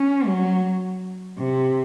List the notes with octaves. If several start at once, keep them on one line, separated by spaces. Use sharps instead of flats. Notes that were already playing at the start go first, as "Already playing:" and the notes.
Already playing: C#4
F#3
C3